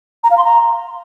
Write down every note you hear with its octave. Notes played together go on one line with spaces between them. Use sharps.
A#5
F5
C6
A#5